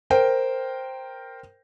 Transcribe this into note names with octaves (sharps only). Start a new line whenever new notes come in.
A#4 C5 G5